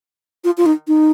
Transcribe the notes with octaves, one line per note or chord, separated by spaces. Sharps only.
F4
F4
D#4
D#4